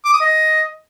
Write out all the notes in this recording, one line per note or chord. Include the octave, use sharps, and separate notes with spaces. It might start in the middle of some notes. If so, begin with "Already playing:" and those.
D6
D#6
D#5